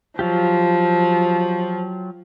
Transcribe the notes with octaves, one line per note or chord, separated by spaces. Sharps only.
F3 F#3 F4 G4